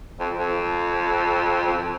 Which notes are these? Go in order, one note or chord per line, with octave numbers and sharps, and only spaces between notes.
F2
F2
F2